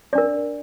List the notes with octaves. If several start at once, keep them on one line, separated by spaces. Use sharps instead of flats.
D4 A#4 D5